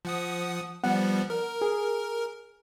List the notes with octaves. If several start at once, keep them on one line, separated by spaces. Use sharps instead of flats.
F3 F#5 D#6
F3 G3 B3 F#5
A#4
G#4